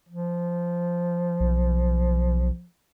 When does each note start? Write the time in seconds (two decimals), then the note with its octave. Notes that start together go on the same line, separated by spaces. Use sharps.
0.09 F3
1.40 B1